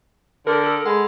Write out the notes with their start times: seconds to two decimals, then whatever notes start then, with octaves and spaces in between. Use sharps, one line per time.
0.47 D3 A#4
0.64 A4 E6
0.86 G#3 F#5 B5